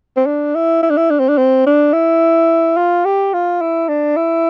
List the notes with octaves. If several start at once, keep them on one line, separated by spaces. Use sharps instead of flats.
C4
D4
E4
E4
D4
E4
D4
C4
D4
C4
D4
E4
F4
G4
F4
E4
D4
E4